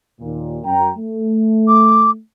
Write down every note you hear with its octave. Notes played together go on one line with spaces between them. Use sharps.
D#2 A#2
F#2 G5 A#5
A3
D6